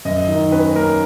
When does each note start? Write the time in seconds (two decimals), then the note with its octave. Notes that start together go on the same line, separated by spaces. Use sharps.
0.05 F#2 D#5
0.29 D#3
0.52 C#4 B4
0.76 A#3 A#4